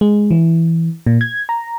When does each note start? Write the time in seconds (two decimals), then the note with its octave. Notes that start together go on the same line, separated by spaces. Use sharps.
0.01 G#3
0.31 E3
1.06 A#2
1.21 G#6
1.49 A#5